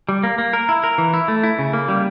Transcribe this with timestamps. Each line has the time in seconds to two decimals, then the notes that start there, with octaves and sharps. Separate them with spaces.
0.09 G3
0.24 A#3
0.38 A#3
0.53 A#4
0.69 E4
0.84 A#4
0.98 E3
1.14 E4
1.28 A3
1.43 E4
1.59 C#3
1.73 A#3
1.89 G3